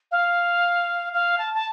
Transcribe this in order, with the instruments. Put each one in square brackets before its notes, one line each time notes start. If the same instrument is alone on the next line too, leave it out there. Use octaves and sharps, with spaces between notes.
[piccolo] F5
F5
A5
A5